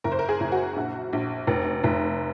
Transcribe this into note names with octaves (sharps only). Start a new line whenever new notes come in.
F#1 A#4
C5
A#4
G#4
F#1
F#4
A#1
A#1
F1
F1